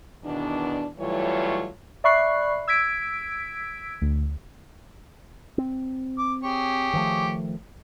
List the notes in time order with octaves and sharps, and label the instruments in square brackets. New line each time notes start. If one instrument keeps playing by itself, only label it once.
[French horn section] E2 B2 D#3 D4
E3 F#3 G3 A3 F4 C#5
[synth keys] D5 E5 B5 C#6 F#6 C7
E6 G#6 B6 D7
D2
[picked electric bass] C4
[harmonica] D6
G4 G#4 C#5
[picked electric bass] D#3 F3 A3